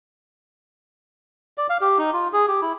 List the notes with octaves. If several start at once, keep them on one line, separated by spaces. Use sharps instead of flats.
D5
F5
G4
D#4
F4
G#4
G4
E4